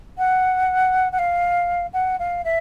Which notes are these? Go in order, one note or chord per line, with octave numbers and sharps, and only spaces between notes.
F#5
F#5
F5
F#5
F5
E5